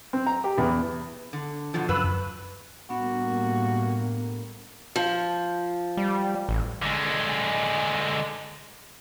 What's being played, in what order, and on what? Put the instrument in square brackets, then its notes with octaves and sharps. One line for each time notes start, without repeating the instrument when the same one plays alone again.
[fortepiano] C4
A#5
G4
E2
[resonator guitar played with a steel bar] D3
B2 D3 F3
[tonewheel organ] F#2 E6 F#6 [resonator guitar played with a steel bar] C#3 B4
[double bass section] A2 G3 A#3 [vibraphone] B3 D4 [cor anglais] F#4
[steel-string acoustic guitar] F3
[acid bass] G3
A1
[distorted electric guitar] D3 G#3